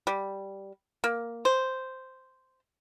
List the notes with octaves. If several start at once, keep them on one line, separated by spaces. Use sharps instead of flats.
G3
A#3
C5